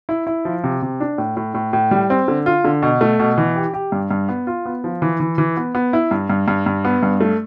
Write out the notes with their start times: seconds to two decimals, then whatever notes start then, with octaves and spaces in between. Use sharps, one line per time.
0.09 E4
0.27 E4
0.45 F3
0.64 C3
0.82 C3
1.00 D4
1.18 A2
1.37 A2
1.54 A2
1.73 A2
1.91 G3
2.10 C4
2.28 D3
2.46 F4
2.64 D3
2.82 B2
3.01 A3
3.19 B2
3.38 E3
3.56 G4
3.74 G4
3.92 G2
4.11 G2
4.29 B3
4.47 F4
4.66 B3
4.84 F3
5.02 E3
5.20 E3
5.38 E3
5.57 B3
5.75 B3
5.93 E4
6.11 G2
6.30 G2
6.48 G2
6.66 G2
6.85 B3
7.03 G2
7.21 A3